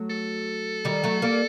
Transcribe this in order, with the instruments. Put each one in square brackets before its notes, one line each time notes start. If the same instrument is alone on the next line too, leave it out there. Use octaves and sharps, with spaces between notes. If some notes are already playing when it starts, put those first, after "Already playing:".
Already playing: [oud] F#3 A3
[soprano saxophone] A4
[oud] D#3 G3
F#3 A3
G3 A#3